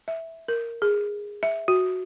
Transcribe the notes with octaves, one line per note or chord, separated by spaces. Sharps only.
E5
A#4
G#4
E5
F#4